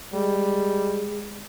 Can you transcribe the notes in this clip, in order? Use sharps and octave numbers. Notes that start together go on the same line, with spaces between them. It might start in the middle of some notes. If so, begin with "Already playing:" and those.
G3 G#3